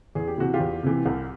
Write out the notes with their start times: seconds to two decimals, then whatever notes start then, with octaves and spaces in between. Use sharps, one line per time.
0.15 E2 G#4
0.27 G4
0.38 C3 E3 F#4
0.54 F4 G4
0.60 E2
0.83 C3 E3
1.06 C2